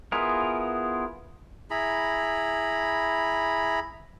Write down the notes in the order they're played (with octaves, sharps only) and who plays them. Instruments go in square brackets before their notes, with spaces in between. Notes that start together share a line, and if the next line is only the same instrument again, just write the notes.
[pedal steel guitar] B3 E4 F4 G#4 A#4
[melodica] E4 G#4 A#5 B5